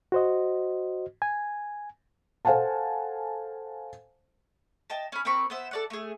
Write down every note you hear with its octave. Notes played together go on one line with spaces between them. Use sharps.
F#4 C5 D#5
G#5
A4 C5 F5 F#5 G#5 A5
D#5 G5 A5
C#4 B5
C4 A#4 B5 C#6
B3 C5 E5
A4 D5 F#5
A3 G#4